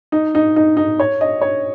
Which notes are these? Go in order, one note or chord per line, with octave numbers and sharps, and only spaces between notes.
D#4
D#4
D#4
D#4
C#5
D#5
C#5